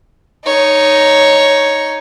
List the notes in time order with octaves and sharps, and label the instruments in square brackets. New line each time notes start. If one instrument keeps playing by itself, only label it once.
[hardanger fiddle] D#4 C#5